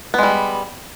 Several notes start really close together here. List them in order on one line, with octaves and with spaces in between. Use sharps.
B3 G#3 G3